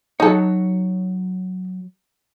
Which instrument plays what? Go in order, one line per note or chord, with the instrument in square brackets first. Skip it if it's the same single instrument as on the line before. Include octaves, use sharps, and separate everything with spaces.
[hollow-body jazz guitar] F#3 C#5 [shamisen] D#4 A4